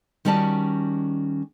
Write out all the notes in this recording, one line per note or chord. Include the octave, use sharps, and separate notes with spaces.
D#3 G3 C#4 F#4 D5 A5